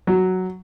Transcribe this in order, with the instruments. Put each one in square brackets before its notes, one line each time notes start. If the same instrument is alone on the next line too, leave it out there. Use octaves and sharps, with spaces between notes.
[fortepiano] F#3